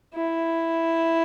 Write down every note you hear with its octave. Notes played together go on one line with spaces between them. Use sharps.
E4